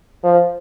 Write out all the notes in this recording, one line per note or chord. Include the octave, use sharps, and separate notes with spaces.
F3